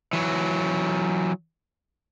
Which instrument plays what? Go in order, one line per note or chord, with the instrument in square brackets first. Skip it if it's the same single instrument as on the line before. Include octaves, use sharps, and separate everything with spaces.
[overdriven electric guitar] E3 F#3